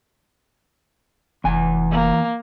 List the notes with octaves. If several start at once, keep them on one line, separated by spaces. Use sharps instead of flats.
F1 E2 G#5
A#3